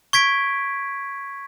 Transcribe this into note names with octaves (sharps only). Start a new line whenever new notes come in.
C#6 G#6 B6 D7